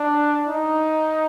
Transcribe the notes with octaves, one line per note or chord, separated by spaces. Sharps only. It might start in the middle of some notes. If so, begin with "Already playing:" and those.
Already playing: D4
D#4